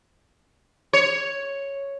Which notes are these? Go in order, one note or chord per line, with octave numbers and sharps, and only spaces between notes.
C#5